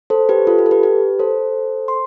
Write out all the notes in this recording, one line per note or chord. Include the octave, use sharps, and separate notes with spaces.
A4 C5
G4 B4
F4 A4
G4
A4
G4 B4
G4 B4
A4 C5
C6